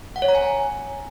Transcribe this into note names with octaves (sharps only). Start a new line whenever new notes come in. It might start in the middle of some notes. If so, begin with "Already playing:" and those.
F#5
C#5
A#5
G#5